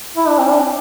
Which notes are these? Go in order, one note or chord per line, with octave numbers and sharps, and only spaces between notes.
E4
D4
C4
D4